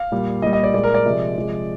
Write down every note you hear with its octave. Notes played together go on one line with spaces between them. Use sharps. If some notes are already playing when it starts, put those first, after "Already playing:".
Already playing: F5
A#2 G3
A#2 G3 D#5
D#5
D5
A#2 G#3 D5
A#4
D5
C3 F3 G#3
C3 F3 G#3